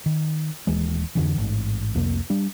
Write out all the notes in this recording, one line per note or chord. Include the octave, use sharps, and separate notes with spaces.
D#3
D#1 D#2 E3 G#3
F2 D3 E3
A1 G#2
C2 F2 C3 A#3
G3 D4